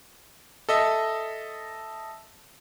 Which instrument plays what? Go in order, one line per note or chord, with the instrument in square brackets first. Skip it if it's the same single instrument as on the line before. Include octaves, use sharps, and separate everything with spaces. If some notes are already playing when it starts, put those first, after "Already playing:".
[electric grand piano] A4 D#5 E5